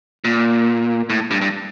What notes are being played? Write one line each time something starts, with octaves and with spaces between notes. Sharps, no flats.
A#2
A2
G2
G2